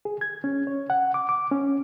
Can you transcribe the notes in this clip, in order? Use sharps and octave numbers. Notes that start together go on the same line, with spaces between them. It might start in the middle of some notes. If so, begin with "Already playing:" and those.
G#4
G#6
C#4
C#5
F#5
D6
D6
C#4